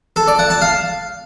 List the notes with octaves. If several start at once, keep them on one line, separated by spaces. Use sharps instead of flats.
A4
D5
F#5
A5
F5